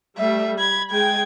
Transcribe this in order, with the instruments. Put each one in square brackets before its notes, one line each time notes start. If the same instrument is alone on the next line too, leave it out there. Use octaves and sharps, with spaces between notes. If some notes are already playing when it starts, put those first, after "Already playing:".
[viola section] G3 A3 [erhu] E5
[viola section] B5 [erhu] G#6
[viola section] G#3 G#4 G5 [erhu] G#6